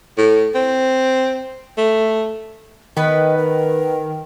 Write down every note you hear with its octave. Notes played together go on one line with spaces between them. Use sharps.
A2
C4
A3
D#3 B3 B4 D#5 B5
A#4